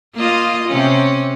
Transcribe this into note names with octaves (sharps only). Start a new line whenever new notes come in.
A#3 F4 D#5
C3 C#4